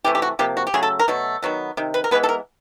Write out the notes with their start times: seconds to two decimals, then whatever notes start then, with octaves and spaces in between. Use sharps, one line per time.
0.04 C3 E3 A3 G4
0.15 G4
0.22 F#4
0.39 C3 F3 A#3 G4
0.57 F#4
0.67 G4
0.74 C#3 F#3 A3 G#4
0.83 A4
0.99 A#4
1.08 B2 F#3 A3
1.42 D#3 F#3 B3
1.77 C3 D#3
1.94 B4
2.04 A#4
2.11 E3 G#3 B3 B4
2.23 A4
2.29 A#4